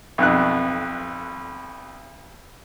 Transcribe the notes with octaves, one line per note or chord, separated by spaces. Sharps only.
B1 F2 F#6